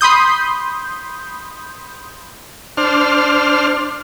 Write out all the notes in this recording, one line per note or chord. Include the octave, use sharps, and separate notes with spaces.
B5 C6 D#6 G6
D4 C5 F6